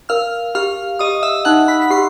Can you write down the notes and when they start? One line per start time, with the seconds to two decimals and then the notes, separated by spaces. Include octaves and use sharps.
0.09 A#4 F5 F6
0.55 G4 F5 F6
0.99 G4 D#5 D#6
1.23 E5 E6
1.45 D#4 F#5 F#6
1.68 B5 B6
1.82 B6
1.90 G4 C6 C7